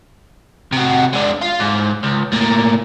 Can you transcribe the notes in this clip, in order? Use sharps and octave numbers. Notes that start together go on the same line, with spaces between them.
C3 F#4
G#3 D4
F4
G#2
C#2
A2 A#3